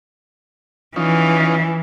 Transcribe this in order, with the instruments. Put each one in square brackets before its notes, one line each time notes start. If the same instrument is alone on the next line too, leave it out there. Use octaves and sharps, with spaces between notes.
[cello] E3 [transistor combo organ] C#4 D#4 F4